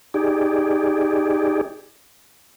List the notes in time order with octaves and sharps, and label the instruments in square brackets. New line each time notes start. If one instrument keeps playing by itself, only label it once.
[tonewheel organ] D#4 G4 G#4 D5